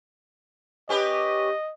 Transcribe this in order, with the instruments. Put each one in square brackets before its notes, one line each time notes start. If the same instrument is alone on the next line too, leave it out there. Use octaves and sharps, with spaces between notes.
[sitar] C#4 G4 B4 [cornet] D#5